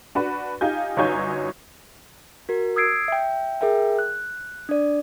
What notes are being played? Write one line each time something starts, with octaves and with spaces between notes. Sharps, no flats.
D4 F#4 B4
D#4 F4 G4 G#5 G6
G1 F#2 D#4 C#5 G#5 G6
F#4 A#4
D#6 E6 G#6 C7 D7
E5 G5
G#4 A#4 E5 G5
F#6
D4 D5